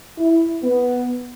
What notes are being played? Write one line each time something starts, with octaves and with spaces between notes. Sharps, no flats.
E4
B3